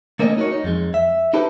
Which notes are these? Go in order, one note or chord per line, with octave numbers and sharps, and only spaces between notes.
A3 A#3 C4 C#4 D5 D#5
D#4 F#4 A4 A#4 C#5
D#4
F2 G#3
E5
D#4 E4 G4 A4 B4 C5